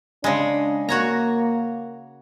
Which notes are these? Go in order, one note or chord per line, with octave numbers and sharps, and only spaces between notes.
C#3 G#3 D4
A#3 F#4 C#5 A#5